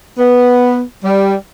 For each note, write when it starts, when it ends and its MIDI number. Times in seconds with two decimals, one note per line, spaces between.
0.18 0.80 59
1.03 1.34 55